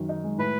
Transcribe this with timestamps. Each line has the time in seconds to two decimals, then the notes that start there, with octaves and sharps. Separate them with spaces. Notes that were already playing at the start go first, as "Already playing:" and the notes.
Already playing: F#2 D#3
0.09 D#4
0.24 G#3
0.38 A2 B4